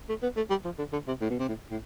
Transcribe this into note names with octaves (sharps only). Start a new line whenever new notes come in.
A3
B3
A3
G3
F3
D3
D3
C3
A2
B2
C3
A2
A2